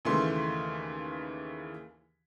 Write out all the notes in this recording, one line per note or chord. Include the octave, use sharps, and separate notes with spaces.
D#2 C#3 E3 A3 C6